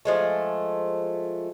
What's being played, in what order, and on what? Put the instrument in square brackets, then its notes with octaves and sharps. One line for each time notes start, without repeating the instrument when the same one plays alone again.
[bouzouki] F3 G#3 A3